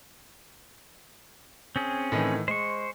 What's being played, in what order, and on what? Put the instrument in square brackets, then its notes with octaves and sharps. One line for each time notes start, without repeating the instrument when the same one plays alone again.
[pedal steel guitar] C4 C#4 G#4
[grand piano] A2 D#3 E3
[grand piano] G#3 [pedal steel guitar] C5 C#6